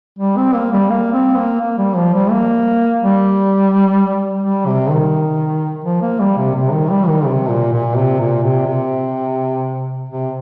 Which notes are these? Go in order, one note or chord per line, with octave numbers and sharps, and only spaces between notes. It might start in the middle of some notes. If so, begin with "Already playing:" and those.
G3
C4
A#3
G3
A#3
C4
A#3
A#3
G3
F3
G3
A#3
G3
G3
C3
D#3
F3
A#3
G3
C3
C3
D#3
G3
D#3
C3
A#2
A#2
C3
A#2
C3
C3
C3